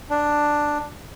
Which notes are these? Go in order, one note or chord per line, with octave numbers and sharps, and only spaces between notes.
D4